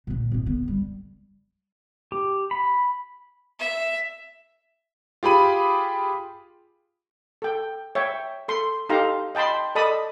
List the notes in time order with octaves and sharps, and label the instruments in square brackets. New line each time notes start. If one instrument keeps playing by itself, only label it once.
[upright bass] A#2 D3
G#1 D4
D3 B3
G3
[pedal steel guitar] G4
B5
[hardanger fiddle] E5
[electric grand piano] F4 G4 G#4 B5 D#7
[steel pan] A4 G5
C#5 E5 G5
A4 C6
D#4 G4 A4 F5 A#5 C6
D#5 G5 A5 B5 C6
A4 D5 D#5 A5 B5 D#6